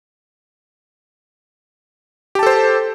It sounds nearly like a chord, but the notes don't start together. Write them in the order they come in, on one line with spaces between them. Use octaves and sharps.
G4 A5 A4 C5